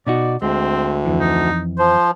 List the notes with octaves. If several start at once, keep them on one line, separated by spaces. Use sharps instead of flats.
B2 D#4 F#4 D5
D2 G#3 C4
F2 E3
D#4
F3 C5